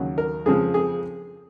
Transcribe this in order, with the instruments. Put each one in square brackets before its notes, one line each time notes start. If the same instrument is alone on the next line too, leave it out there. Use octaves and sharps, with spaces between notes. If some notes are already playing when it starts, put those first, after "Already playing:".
Already playing: [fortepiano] D#2 C#3 F#3
A#4
F2 C#3 F3 G#3 G#4
G#4